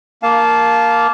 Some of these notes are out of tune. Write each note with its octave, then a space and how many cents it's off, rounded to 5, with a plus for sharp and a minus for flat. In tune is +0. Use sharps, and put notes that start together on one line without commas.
A#3 +0 F5 +0 A5 -20